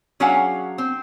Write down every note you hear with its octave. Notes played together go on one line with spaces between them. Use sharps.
F#3 C#4 D4 G#4 F5 F#5
C4